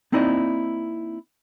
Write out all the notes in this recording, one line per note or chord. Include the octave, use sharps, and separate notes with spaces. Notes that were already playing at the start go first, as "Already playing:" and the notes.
A#3 C4 D#4 E4 D5 D#5